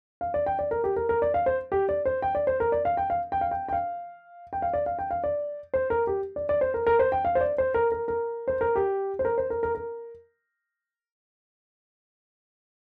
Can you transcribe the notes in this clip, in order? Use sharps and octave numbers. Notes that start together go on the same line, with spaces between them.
F5
D5
G5
D5
A#4
G4
A#4
A#4
D5
F5
C5
G4
D5
C5
G5
D5
C5
A#4
D5
F5
G5
F5
G5
F5
G5
G5
F5
G5
F5
D5
F5
G5
F5
D5
C5
A#4
G4
D5
D5
C5
A#4
A#4
C5
G5
F5
C5
D5
C5
A#4
A#4
A#4
C5
A#4
G4
C5
A#4
C5
A#4
A#4
A#4